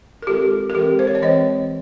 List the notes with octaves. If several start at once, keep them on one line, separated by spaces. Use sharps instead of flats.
A#4
D#3 G#3 C4 F4 G4 A4
A#4
E3 G#3 C4 G4 A4
C5
C#5
D5
E3 G#3 C4 C#5 D#5